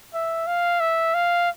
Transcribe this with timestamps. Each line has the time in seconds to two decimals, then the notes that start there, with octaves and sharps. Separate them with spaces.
0.14 E5
0.47 F5
0.80 E5
1.15 F5